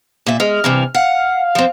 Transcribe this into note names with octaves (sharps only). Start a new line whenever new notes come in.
A#2 E5
G#3 F6
G2 C3 E3
F5 F#5
F3 C4